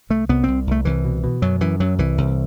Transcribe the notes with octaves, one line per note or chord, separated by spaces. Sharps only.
C2 A3
C2 B3
C2 C4
C2 A3
C2 E3
B2
B2
F#2 F#3
F#2 E3
F#2 F#3
C2 E3
C2